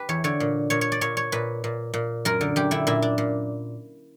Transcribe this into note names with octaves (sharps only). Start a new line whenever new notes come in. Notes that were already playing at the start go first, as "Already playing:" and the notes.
Already playing: G4 B4
E2 C#5
D3 C#5
A#2
A#2 C#5
C#5
D5
A#2 C#5
C#5
A#2 B4
A#2
A#2
F#2 A#4
D3
F#2 G4
D3 E4
A#2 E4
D4
A#2